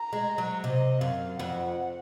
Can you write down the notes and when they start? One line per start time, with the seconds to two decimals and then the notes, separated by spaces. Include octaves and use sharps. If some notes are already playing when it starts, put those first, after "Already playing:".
Already playing: A#5
0.13 G#3
0.38 F#3
0.64 C3 D#5
1.01 F#2 F5
1.39 F2 F#5